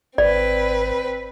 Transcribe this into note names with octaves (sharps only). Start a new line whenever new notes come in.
G#1 C4 B4 D5